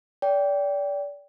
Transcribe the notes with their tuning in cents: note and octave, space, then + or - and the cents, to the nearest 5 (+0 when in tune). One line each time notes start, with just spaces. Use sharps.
D5 -30 G5 +0